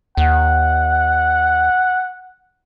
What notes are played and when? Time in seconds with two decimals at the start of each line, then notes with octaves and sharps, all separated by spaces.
0.17 D#2 F#5